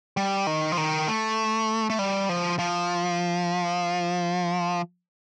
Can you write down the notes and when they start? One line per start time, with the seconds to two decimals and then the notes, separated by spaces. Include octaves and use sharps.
0.17 G3
0.47 D#3
0.72 F3
0.77 D#3
1.08 A3
1.90 A3
1.99 G3
2.29 F3
2.59 F3